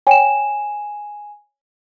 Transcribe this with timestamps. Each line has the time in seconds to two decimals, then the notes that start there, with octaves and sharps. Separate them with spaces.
0.07 C#5 G5 G#5 E7